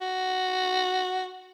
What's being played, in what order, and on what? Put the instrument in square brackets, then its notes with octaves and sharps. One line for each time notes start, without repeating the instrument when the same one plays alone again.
[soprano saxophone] F#4